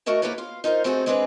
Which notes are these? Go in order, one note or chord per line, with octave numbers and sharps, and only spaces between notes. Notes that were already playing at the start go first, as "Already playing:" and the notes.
A3 F#4 A#4 D#5 A5
A#3 E4 G4 A4 B4 C#5
F4 F5
D#4 F4 G#4 A#4 C5
A3 C4 D#4 F#4 G#4 A4
G#3 C4 D4 E4 G#4 B4